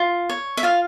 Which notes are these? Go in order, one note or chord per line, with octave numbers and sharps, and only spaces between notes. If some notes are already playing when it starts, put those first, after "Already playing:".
Already playing: F4
C#5
E5
F4 F5